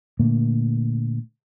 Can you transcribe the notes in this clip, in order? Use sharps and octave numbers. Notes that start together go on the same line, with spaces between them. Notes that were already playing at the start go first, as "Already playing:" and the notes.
A#2 D3 A3 A#3